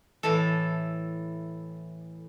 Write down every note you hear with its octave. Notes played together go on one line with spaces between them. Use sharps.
A2 E3 A4